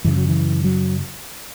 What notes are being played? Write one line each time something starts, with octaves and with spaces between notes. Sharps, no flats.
F#2 C#3 E3
F#3
E3
F#3